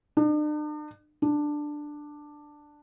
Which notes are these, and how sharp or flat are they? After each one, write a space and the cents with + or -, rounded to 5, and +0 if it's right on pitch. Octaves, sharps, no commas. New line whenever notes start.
D4 +45
D4 +10